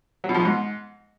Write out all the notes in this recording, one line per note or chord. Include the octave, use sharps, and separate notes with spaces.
F#3
B2
F3
B2
G#2